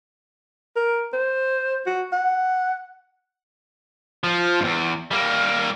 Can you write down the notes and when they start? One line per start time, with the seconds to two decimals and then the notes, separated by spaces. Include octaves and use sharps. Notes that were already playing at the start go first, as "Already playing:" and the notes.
0.76 A#4
1.13 C5
1.86 F#4
2.12 F#5
4.24 F3
4.60 E2 G2
5.11 G3 A#3